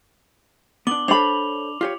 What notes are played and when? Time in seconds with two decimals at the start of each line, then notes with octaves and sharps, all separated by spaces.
0.87 B3 D4 D6 F#7 G7
1.08 D4 A4 C5 C#5 B5 F7
1.81 F4 G4 C#5